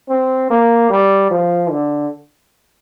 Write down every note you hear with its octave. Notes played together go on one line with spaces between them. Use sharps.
C4
A#3
G3
F3
D3